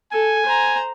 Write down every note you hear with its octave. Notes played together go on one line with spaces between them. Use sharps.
A4 G#5
C5 A#5